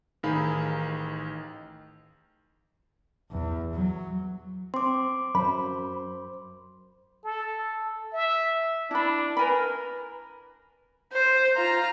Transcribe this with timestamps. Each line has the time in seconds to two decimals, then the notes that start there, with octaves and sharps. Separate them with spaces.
0.23 A1 D#3 D#4 G#4 F5 B5
3.31 E2
3.74 F#3
4.74 C4 C6 D6
5.35 F#2 C5 B5
7.24 A4
8.13 E5
8.91 D4 E4 B5
9.37 A#4 B4 G#5 B5
11.12 C5
11.56 F4 A#5